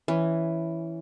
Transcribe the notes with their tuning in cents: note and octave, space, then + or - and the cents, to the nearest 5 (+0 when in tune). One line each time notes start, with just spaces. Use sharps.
E3 +0 C#4 +0